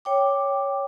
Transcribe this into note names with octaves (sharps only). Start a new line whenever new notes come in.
C#5 G5 D6